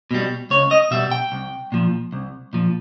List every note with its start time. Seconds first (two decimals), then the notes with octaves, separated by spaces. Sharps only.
0.11 B2 G3
0.50 C#2 C#5
0.71 D#5
0.91 B2 G3 E5
1.11 G5
1.32 C2
1.72 A#2 F3
2.12 C2
2.53 A#2 F3